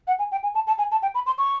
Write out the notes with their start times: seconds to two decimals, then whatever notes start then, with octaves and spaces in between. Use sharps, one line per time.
0.07 F#5
0.19 G#5
0.32 G5
0.43 G#5
0.55 A5
0.67 A5
0.78 G#5
0.92 A5
1.02 G5
1.15 B5
1.26 C6
1.38 C#6